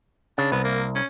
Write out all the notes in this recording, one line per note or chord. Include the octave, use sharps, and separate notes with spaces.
C#3 D4
C2 B3
A#3
C#4